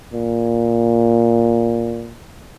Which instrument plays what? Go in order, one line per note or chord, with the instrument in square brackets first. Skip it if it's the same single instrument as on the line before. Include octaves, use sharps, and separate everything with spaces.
[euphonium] A#2